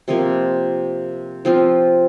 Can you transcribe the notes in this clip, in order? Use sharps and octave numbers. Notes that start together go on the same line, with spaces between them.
C3 F3 A#3
F3 C4 F4